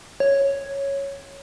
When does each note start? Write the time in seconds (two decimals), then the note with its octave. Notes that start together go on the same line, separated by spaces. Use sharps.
0.20 C#5